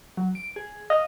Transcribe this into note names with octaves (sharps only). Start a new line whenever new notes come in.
F#3
D7
G#4
D#5 F5